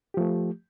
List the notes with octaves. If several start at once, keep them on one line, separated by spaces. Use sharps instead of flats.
F3 A3 G4